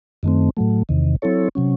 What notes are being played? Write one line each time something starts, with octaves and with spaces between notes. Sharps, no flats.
F#2 D#3 A3 C4
A2 F#3 A3
E2 C3 D#3
F#3 C4 E4 A4 C#5
C3 F#3 C#4